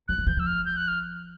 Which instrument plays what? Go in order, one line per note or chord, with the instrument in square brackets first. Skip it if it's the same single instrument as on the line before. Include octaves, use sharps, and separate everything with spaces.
[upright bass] F#3 [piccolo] F#6
[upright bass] F3
[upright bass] E3 [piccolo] G6
[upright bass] F3 [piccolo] E6
[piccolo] F6
G6
F#6
F6